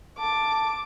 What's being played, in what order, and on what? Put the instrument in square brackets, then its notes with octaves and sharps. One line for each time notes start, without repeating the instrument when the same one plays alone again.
[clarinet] A5 [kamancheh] D6